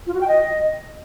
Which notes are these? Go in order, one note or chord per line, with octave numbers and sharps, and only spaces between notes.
F4
F#4
G5
D#5